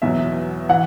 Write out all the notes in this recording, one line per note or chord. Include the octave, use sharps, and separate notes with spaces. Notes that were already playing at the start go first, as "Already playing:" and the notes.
E2 B2 F#3 E5
E3 F#5